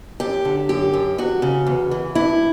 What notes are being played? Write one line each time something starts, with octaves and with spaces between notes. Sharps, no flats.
F#2 G4
D3
F#2 G4
F#2
E2 F#4
C#3
E2
E3
G2 E4